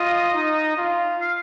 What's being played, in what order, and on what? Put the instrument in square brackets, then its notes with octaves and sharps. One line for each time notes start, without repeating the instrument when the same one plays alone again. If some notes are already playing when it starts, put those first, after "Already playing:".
Already playing: [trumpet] F4 [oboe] D#5
[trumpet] D#4
F4
[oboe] F5